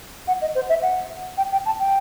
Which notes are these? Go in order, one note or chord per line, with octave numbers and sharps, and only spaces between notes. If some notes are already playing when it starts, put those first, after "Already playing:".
F#5
D#5
C5
E5
F#5
G5
G5
A5
G5